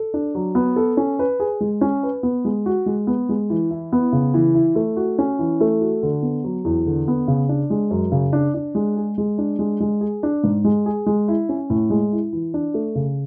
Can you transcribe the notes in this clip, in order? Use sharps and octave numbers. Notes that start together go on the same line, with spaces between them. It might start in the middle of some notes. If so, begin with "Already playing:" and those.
Already playing: A4
D4
F#3
B3
A4
C#4
B4
G#4
G#3
C#4
B4
B3
G#3
F#4
G#3
B3
G#3
E3
E4
B3
C#3
E3
E4
A3
F#4
C#4
E3
A3
F#4
D3
B3
F#3
E2
D3
B3
C#3
D4
G#3
F#2
C#3
D4
D4
G#3
G#4
G#3
D4
G#3
G#3
G#4
D4
G#2
G#3
G#4
G#3
E4
C#4
A2
G#3
E4
E3
D4
A3
C#3